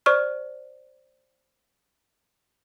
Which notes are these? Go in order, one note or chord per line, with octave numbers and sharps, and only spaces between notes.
C5 D5 C#6 F6